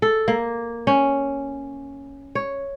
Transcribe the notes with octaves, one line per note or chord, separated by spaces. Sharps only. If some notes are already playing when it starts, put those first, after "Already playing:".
A4
A#3
C#4
C#5